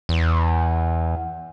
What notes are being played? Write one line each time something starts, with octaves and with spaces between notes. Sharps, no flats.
E2